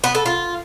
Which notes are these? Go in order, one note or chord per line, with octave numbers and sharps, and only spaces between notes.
B3
A4
F4